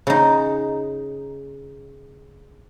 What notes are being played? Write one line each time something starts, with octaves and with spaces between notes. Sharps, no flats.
C#3 D#4